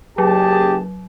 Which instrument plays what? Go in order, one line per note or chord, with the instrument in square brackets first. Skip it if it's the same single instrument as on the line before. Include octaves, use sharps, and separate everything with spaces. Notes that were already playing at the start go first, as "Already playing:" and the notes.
[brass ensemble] F#1 G#4 A5 [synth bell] F#3 [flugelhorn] G4